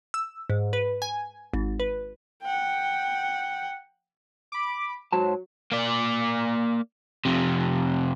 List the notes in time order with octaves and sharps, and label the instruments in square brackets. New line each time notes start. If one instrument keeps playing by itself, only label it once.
[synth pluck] E6
G#2
B4
G#5
G#1
B4
[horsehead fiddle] F#5 G5
[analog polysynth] B5 D6
[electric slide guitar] G#2 C5 A5 [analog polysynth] F#3
[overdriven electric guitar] A#3 D5
F2 C3